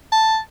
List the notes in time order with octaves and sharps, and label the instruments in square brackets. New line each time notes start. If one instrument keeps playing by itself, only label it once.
[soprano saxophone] A5